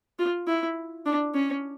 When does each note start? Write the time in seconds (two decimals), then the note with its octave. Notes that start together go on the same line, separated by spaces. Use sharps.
0.19 F4
0.47 E4
1.06 D4
1.34 C#4